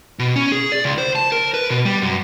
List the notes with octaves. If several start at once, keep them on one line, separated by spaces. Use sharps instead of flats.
B2
C#4
G#4
D5
C#2
C5
A5
A#4
B4
B2
G3
F#2